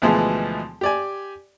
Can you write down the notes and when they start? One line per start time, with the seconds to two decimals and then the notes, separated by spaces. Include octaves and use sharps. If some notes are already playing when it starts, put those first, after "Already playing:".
0.02 D2 B2 E3 F3 G#3 B3
0.81 G4 D5 G#5